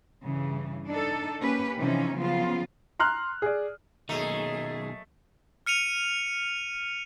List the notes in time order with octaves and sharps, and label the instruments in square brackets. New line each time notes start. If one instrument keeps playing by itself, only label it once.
[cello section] G2 C#3 E3
D4 D#4 A4
A#3 C#4 G4 B4
C3 E3 F3 C#4 D#4
C#3 F3 F#3 B3 F4
[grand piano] A#5 C6 F6 F#6
G#4 D5
[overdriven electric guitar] B2 D#3 [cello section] F#3 A#3 G#4 [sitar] A3 [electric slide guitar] D#5 A#5
[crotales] F6 C#7 D#7 F7